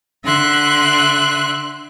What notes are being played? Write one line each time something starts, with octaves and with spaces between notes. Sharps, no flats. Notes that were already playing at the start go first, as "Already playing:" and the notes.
D3 E5 C6 F#6